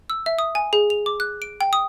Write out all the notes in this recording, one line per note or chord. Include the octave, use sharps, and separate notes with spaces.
E6
E5
D#6
G#5
G#4
F7
D6
F#6
D7
G5
D#6